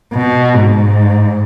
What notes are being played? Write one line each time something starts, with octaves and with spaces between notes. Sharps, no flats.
B2
G#2